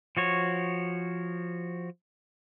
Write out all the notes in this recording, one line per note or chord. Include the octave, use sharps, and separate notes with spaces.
F3 F#4 C#5